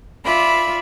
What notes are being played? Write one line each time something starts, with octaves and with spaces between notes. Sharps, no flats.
F4 D5 E5 B5